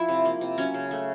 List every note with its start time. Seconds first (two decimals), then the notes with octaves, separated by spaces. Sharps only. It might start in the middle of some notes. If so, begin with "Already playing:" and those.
Already playing: F3 E4 E5
0.09 C3
0.25 A#3
0.41 C3
0.58 F#3 C#4 C#5
0.74 C#3
0.91 A3